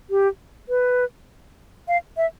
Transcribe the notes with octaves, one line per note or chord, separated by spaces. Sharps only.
G4
B4
F5
E5